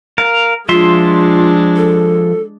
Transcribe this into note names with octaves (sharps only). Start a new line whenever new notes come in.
A#4 F5
F3 G#3 D4 F4 E5 C6
A4